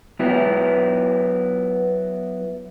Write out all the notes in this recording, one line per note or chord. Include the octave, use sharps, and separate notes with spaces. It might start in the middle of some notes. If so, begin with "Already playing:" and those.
F#3 B3 E4